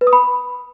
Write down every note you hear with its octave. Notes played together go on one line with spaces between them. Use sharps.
B4
D#6
B5